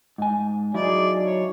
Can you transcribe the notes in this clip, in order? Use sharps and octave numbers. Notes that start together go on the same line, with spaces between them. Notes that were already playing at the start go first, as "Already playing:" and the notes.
G#2 G#5
F#3 D#4 E4 G#4 D5
C#5